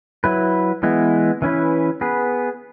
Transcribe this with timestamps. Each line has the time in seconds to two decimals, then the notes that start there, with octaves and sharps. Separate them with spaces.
0.24 F#3 E4 B4
0.83 E3 G#3 B3 E4
1.42 E3 C#4 E4 B4
2.01 B3 G#4 B4